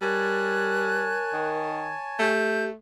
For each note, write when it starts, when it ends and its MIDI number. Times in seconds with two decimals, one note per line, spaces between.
0.02 1.22 55
0.02 1.68 70
0.02 2.32 73
0.02 2.32 80
0.02 2.32 81
0.02 1.48 90
1.33 1.94 51
2.19 2.75 57
2.19 2.70 67
2.19 2.65 91